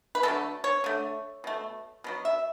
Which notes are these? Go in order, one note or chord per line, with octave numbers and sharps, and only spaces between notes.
B4
D3 F#3 A3 A4
C#5
D3 A3
B2 A3
B2 F#3 B3
E5